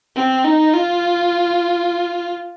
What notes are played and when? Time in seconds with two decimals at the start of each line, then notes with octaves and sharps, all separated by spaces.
0.16 C4
0.45 D#4
0.74 F4